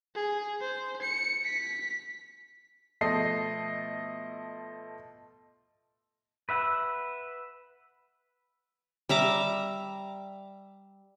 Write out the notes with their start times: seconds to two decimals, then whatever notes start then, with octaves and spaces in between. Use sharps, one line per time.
0.15 G#4
0.61 C5
1.02 C#7
1.45 B6
3.01 B2 F3 A3 A4 D#5 C7
6.49 B4 E5 F#5
9.09 G3 E5 A#5 D6